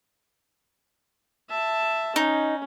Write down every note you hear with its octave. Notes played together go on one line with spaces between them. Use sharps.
E5 A5
C#4 D#4